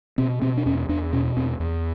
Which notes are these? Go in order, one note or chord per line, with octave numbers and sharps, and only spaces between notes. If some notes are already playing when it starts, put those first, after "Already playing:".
B2 C4
B2 C4
D4
E2 C#4
E2 D4
B2 C#4
E2 C4
E2